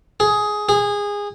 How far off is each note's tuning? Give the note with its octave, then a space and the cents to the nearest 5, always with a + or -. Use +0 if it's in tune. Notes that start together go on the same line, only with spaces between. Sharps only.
G#4 +10
G#4 -20